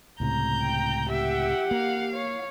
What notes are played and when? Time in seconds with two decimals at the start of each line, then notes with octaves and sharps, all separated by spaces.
0.20 C#2 A2 C3 A#5 G6
0.61 G5
1.10 G4 E5 F#5 G5
1.71 A#3 F5
2.14 C#5